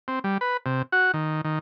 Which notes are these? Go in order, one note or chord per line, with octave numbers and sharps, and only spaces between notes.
C4
G3
B4
C3
F#4
D#3
D#3